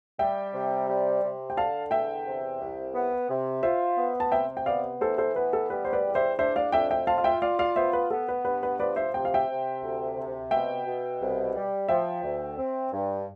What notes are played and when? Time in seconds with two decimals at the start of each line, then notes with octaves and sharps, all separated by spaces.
0.19 G3 E5 G5
0.54 C3
0.88 G3
1.23 C3
1.50 G5
1.57 D3 F5 A5
1.91 E2 E5 G5
2.26 C3
2.60 C2
2.94 B3
3.29 C3
3.63 F4 C5 E5
3.98 B3
4.20 A5
4.32 C3 E5 G5
4.57 G5
4.66 B3 D5 F5
5.01 E3 A4 C5
5.18 A4 C5
5.35 B3 B4
5.53 A4
5.70 G3 B4
5.85 C5
5.93 B4 D5
6.04 E2
6.15 C5 E5
6.38 D4 C5 E5
6.56 D5 F5
6.72 F2 E5 G5
6.91 E5 G5
7.07 F4 F5 A5
7.18 F5
7.24 E5 G5
7.42 F4 D5 F5
7.59 D5 F5
7.76 B3 C5 E5
7.93 B4
8.11 B3 A4
8.28 B4
8.45 G2 B4
8.63 B4
8.80 F3 B4 D5
8.96 C5 E5
9.14 C3 G5
9.25 F5
9.34 E5 G5
9.49 C3
9.83 D2
10.17 C3
10.51 B2 E5 G5
10.86 B2
11.21 C2
11.55 G3
11.89 F3 E5 G5
12.23 D2
12.58 C4
12.92 G2